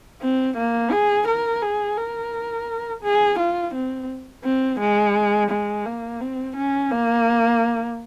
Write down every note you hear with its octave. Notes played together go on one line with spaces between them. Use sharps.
C4
A#3
G#4
A#4
G#4
A#4
G#4
F4
C4
C4
G#3
G#3
A#3
C4
C#4
A#3